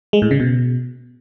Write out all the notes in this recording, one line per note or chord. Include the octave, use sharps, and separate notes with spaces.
G#3
A2
C#3
B2